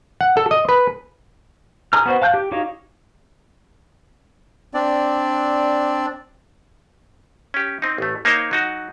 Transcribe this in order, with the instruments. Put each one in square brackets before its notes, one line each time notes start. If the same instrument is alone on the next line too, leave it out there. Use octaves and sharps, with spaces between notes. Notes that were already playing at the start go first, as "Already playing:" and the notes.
[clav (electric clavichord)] F#5
A4
D#5
B4
[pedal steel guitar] G#4 A#5 F6
B3 F#4 C5
F5 A5 F#6 G6
G4
D#4 F#4 G4 C#5 F5
[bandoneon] C4 D4 D5
[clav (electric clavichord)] C#4 G4
C4 D#4
A1 A3
A#3 D#4 A#4 C5 C#5
F#3 D#4 F#4